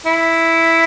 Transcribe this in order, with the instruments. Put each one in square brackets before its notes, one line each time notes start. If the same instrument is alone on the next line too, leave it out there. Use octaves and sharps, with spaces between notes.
[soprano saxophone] E4